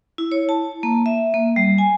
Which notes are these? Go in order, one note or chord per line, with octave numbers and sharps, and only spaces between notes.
E4
C#5
A5
A#3
E5
A#3
G3
G#5